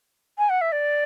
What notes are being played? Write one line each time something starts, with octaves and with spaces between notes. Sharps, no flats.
G#5
F#5
E5
D5